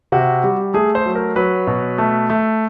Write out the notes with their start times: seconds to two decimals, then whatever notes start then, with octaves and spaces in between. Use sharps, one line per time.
0.12 C3 F#4
0.44 G3
0.74 A3 G#4
0.95 C5
1.06 F#3
1.15 A#4
1.36 F#3 B4
1.67 B2
1.98 A3
2.30 A3